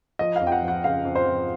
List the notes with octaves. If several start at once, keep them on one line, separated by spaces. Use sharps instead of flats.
F3 D#5
F2 F5
G5
F#5
F3
F#5
C#3 F5
F2
C5
F2